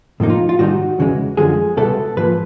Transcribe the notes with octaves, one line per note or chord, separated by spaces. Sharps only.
A2 F3 A#3 D#4
F4
F4
G#2 D#3 G3 C4 D#4 F#4
E2 C#3 E3 G#3
F#2 D3 F3 G#3 G#4
C#2 B2 G3 B3 E4 A4
G#2 F3 A#3 B4